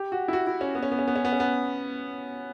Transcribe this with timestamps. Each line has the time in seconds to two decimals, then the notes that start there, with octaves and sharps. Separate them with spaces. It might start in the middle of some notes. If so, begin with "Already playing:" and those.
Already playing: G4
0.12 F#4
0.28 E4
0.33 F#4
0.47 E4
0.61 C#4
0.75 B3
0.83 C#4
0.92 B3
0.99 C#4
1.08 B3
1.16 C#4
1.25 B3
1.33 C#4
1.40 B3